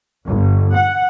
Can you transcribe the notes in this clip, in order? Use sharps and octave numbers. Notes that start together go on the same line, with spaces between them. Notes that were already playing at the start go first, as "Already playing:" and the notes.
G1
F#5